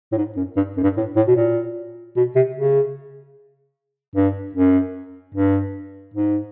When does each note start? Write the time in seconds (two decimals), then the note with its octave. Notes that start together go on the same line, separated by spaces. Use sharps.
0.12 A2
0.17 G#2
0.37 F#2
0.57 G2
0.77 F#2
0.83 G2
0.97 A2
1.16 A2
1.28 B2
1.36 A#2
2.17 B2
2.35 C3
2.56 C#3
4.16 G2
4.55 F#2
5.35 G2
6.14 G#2